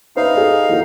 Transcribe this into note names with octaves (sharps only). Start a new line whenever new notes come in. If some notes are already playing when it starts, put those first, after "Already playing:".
D#4 B4 C5 E5 F5
G#4 A4 D#5
E3 F#4 A#4